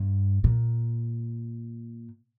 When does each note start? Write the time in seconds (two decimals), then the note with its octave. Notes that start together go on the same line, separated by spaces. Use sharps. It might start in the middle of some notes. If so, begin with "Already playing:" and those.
Already playing: G2
0.44 A#2